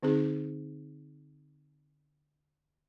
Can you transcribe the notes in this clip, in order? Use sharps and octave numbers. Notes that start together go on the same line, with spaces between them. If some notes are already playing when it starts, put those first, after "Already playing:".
D3 C4 D#4 G#4